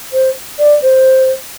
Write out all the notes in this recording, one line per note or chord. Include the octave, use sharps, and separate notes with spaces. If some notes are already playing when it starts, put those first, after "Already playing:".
C5
D5
C5